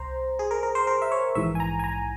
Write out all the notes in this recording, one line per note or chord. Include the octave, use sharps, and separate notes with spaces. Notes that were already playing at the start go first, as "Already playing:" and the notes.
Already playing: C2 C5 A#5
G#4
A#4
A#4
C5
A#4
E5
C#5
A#1 G#2 E3 E5
G#5
A#5
G#5
A#5